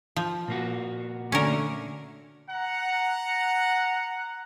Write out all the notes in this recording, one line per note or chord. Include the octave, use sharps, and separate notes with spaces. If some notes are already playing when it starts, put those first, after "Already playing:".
F3
A#2 A#3 F#4
D3 A3 C#4 A#4
F#5 A#5